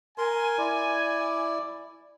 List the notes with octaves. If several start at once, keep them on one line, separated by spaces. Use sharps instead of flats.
A#4 G#5 C6
E4 D5